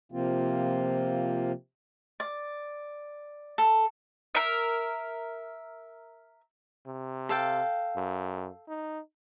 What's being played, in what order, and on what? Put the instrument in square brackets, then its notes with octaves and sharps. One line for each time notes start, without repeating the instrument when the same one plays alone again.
[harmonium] C3 F3 A#3 C4 F4
[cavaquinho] D5
A4
[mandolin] A#4 E5
[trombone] C3
[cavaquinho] A4 F5 G5
[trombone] F#2
D#4